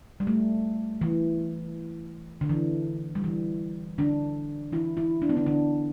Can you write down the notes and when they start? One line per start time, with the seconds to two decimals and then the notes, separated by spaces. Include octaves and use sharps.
0.20 G3
0.27 A3
1.01 E3
2.41 D3
2.49 E3
3.15 G3
3.24 E3
3.98 D3 D4
4.73 E3 E4
4.97 E3 E4
5.22 D4
5.29 B3
5.36 D3 D4
5.46 D3 D4